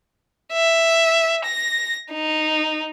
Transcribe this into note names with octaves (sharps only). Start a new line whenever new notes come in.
E5
A#6
D#4